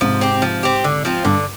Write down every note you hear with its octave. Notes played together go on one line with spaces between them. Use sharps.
G#2 C3 F3
C4 G4
F3
C4 G4
D3
F3 C4 F4
G2 D3